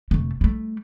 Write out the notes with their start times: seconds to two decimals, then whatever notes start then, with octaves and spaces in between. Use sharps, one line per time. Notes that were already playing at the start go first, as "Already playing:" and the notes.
0.11 F1 A3
0.41 G3 A3